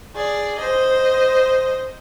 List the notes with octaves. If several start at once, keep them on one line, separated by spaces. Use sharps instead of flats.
G#4 D5
C5 D#5